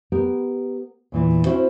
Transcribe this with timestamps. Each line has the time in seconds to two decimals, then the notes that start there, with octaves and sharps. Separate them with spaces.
0.12 B3 G4 A#4
1.12 E2 A#2 E3
1.45 C4 C#4 E4 F#4 C5